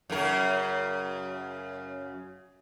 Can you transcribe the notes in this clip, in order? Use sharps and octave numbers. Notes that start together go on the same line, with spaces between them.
F#2 C#3 A#4